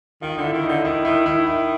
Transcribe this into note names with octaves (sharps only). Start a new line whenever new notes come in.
D#3 F4
D3 E4
D#3
D#4
D3
D#3 E4
D#3 E4
D#3 E4
E4